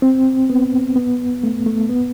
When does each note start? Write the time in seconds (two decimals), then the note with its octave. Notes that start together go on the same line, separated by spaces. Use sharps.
0.02 C4
0.50 B3
0.96 B3
1.43 A3
1.66 A3
1.89 B3